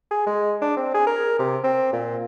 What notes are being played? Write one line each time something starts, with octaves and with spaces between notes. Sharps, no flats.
G#4
G#3
D4
C4
G#4
A#4
C3
C4
A#2